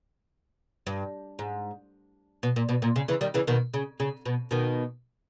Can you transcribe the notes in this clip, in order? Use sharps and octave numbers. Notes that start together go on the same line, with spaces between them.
G2
G#2
B2
A#2
B2
A#2
C#3
C#3 E3
D#3 G3
C#3 E3
B2 D#3
C#3
C#3
B2
B2 D#3